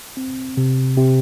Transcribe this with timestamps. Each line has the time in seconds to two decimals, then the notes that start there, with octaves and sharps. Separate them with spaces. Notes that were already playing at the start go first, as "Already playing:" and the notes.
0.17 C4
0.57 C3
0.97 C3